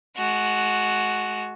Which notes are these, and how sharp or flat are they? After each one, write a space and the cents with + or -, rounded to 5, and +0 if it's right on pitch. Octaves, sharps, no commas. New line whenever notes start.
G#3 +35 F#4 +0